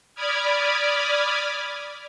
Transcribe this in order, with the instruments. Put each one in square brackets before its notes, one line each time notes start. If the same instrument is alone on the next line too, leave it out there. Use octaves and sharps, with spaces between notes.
[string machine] D5 B5 D6 D#6 F6 G#6